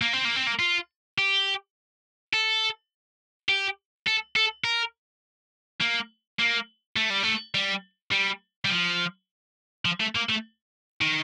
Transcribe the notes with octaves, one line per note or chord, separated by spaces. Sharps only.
A#3
C4
A#3
C4
A#3
F4
G4
A4
G4
A4
A4
A#4
A#3
A#3
A3
G3
A3
G3
G3
G3
F3
F3
A3
A#3
A3
D#3